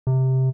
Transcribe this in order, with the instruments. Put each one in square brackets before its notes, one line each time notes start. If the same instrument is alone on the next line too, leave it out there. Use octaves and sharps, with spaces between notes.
[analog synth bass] C3